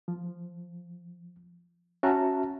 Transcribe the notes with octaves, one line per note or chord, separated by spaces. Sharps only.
F3
C#4 F#4 E5 A5 A#5